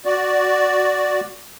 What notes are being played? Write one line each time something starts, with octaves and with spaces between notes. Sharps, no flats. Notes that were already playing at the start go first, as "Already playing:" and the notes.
F#4 D5